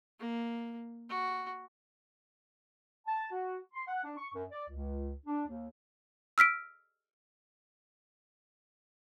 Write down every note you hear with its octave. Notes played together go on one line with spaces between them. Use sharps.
A#3
F#4
A5
F#4
C6
F#5
D4
C#6
F#2
D5
C#2
D4
D#2
E6 F6 B6 D7